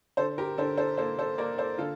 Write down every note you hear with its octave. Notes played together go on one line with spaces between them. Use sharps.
D3 A4 C5
G4 A#4
D3 A4 C5
A4 C5
A#3 A4 C5
A4 C5
A#3 A#4 D5
A4 C5
D3 F4 A4